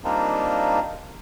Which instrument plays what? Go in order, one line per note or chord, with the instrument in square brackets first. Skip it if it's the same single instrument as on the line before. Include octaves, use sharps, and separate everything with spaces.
[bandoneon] G3 A#3 C4 D4 D#4 F4